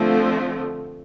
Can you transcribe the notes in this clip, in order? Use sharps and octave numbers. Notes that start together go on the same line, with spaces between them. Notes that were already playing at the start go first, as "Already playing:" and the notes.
Already playing: D3 F3 A3 C4